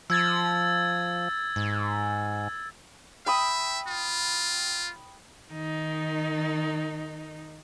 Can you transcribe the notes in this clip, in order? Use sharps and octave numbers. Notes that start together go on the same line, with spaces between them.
F3 E6 G#6 A6
G#2
E5 G5 B5 D#6
F4
D#3 D#4